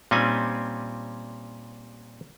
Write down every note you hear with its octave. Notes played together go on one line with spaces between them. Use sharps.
A#2 G3 C4 C#4 D#4 G#5